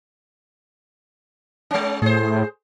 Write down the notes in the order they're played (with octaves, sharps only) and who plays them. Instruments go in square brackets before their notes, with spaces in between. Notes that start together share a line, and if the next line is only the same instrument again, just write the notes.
[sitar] G#3 C#4
[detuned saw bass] A2 [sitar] G#4 C5